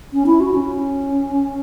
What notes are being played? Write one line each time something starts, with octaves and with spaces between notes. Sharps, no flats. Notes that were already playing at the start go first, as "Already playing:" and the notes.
C#4
E4
F#4
C#4